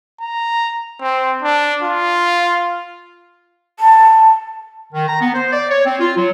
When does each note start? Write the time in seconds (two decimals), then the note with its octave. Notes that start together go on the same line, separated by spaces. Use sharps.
0.21 A#5
1.01 C4
1.42 D4
1.82 F4
3.80 A5
4.93 D#3
5.08 A#5
5.21 B3
5.34 C5
5.52 D5
5.70 C#5
5.86 C4
6.00 F4
6.16 F#3